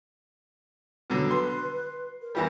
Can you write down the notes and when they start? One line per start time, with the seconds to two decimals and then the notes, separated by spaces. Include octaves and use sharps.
1.10 B2 D3 F#3
1.31 B4 C6
2.22 A#4
2.35 E2 E3 G3 A#4